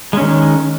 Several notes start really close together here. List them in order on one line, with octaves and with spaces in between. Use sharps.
G#3 C#4 D#3